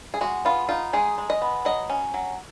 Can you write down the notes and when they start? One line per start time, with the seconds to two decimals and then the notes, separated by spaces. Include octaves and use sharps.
0.14 G#4
0.21 G#3 F#4
0.45 B3 F4
0.69 D#4 F4
0.93 G#3 G#4
1.18 G#3
1.30 D#5
1.42 B3
1.65 F#3 D#5
1.90 C#4
2.14 F#3